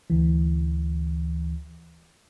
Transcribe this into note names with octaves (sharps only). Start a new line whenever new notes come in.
D2 E3